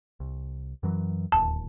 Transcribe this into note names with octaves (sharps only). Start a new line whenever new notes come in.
C2
F#2 E3 F#3
D1 D#2 A5